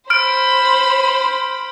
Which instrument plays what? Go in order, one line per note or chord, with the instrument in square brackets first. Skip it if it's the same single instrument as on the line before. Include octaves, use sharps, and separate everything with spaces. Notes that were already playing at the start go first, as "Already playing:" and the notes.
[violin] C5 B5 [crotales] F6 D7